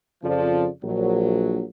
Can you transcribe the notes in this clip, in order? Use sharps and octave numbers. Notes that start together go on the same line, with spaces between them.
F2 C#3 F3 D5
A#1 F#3